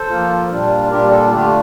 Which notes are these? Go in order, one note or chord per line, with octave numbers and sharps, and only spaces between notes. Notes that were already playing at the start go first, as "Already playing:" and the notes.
Already playing: A4 C5
F3 A#3 F4
A#2 G3 D4 F4
A#2 G3 D4 F4 G4 A#4
F4 A4
D3 A3 D4 F4 G4